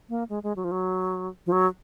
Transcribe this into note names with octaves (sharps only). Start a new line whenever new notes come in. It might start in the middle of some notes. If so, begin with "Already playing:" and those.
A#3
G#3
G#3
F#3
F3
F#3
F3
F#3